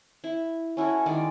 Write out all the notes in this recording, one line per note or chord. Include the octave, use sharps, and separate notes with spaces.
E4
C#4 E4 F#4 A4
D#3 G#3 D5